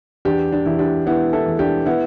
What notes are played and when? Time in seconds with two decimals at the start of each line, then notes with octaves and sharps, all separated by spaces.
0.25 E2 D4 G4
0.52 D4
0.66 E2 E4
0.79 D4 G4
1.06 E3 B3 E4
1.33 E4 A4
1.46 E2
1.59 D4 G4
1.86 B3 E4